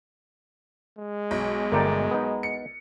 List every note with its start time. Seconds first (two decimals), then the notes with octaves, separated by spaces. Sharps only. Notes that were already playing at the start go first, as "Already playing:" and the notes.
0.98 G#3
1.31 B1
1.72 G1 A3 A#4 D5 G5
2.11 B3 D#4
2.43 C#7